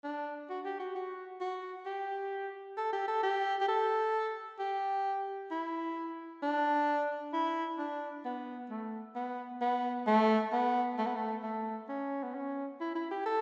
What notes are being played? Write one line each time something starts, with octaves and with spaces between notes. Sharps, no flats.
D4
F#4
G4
F#4
F#4
F#4
G4
A4
G4
A4
G4
G4
A4
G4
E4
D4
E4
D4
B3
A3
B3
B3
A3
B3
A3
B3
A3
A3
C#4
B3
C#4
E4
E4
G4
A4